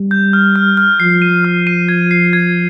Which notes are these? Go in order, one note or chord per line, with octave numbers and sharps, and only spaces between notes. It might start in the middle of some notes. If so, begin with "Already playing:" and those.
Already playing: G3
G6
F6
F6
F6
F3 C7
D#7
F6
D#7
G#6
C7
G#6